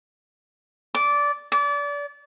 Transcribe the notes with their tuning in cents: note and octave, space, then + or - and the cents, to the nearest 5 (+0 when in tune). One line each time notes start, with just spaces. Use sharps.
D5 -15
D5 -30